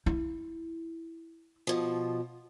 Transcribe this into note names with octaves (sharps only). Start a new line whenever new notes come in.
E4
B2 F3